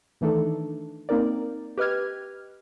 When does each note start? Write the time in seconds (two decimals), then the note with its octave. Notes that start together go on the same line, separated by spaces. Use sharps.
0.21 D#3 E3 A3 D4 D#4 A4
1.09 A#3 C4 D#4 A#4 D5
1.78 G4 B4 D#5 F6 G#6